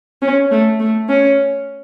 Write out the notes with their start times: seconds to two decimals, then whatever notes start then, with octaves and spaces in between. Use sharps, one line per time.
0.22 C#4
0.51 A3
0.80 A3
1.09 C#4